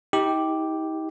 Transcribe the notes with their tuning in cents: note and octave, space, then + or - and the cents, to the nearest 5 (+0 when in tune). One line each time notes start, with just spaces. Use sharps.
D#4 +40 G4 +0